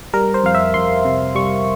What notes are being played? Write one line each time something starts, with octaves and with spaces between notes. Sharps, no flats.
G3 A#4
C5
F2 F5
E5
F2 C6
C3
G3 C#6